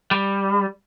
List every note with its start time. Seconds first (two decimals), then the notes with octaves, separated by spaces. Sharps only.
0.11 G3